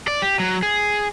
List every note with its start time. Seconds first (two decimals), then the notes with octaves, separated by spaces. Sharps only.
0.08 D5
0.22 G4
0.40 F#3
0.63 G#4